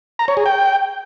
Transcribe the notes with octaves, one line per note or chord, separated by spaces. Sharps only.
A#5
C#5
G#4
G5